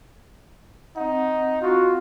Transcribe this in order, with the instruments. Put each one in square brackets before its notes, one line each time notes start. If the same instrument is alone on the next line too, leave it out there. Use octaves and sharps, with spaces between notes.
[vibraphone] C4 F#5 [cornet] D#4
[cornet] F4 [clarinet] F#4